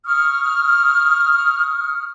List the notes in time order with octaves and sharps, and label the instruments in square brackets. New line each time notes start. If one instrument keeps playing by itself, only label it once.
[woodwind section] C#6 D#6 F6